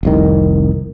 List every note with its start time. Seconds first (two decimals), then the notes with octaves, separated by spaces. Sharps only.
0.03 F1 C2 D#3